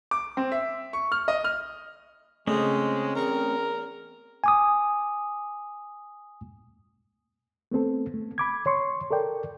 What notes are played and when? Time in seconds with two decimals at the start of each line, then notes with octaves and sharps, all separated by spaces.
0.11 D6
0.37 C4
0.52 E5
0.93 C#6
1.12 F6
1.28 D#5
1.44 F6
2.47 C#3 F3 G#3 A3 C4 C#4 D#5
3.15 E2 A#4 C#6
4.44 G#5 D6 D#6
7.71 A3 B3 C4 A4
8.14 A3
8.38 B5 D6 G#6
8.66 C#5 C6 C#6
9.11 A4 A#4 D5 G5